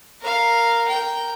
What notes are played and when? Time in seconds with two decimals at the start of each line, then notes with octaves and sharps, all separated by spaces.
0.22 A#4 F5
0.88 A#4 G5